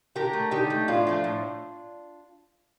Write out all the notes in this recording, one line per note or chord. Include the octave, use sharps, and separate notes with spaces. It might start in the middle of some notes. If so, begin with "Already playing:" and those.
D3 G4 A#4
A3
D3 D#4 G4
A3
A2 D4 F4
F3 A3
A2